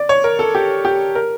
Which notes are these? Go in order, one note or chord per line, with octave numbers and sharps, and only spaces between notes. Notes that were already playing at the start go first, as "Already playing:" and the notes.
Already playing: D5
C#5
A#4
A4
G4
G4
A#4